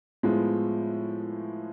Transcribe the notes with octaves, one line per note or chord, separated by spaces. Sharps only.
A2 F3 G#3 B3